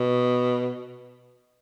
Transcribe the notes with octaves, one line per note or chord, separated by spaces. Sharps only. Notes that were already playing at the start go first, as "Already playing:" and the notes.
Already playing: B2